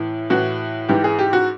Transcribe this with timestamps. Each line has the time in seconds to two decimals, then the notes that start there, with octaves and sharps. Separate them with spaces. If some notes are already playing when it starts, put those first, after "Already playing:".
Already playing: A2 E3
0.30 A2 E3 F#4
0.89 G#2 E3 G4
1.04 G#4
1.19 G4
1.33 F#4